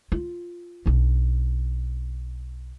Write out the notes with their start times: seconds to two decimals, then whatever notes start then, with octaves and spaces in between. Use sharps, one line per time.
0.12 F4
0.86 B1 D4